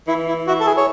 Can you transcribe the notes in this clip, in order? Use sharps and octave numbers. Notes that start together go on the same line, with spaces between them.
E3 E4
E4
E4 F#4
A4
G#4
C#5